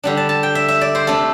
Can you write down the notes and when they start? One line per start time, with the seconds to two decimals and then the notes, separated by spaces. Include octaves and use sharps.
0.03 D3 G3 D4
0.17 A5
0.29 A5
0.43 G5
0.55 E5
0.68 E5
0.81 D5
0.95 C5
1.07 C3 A3 D4 A4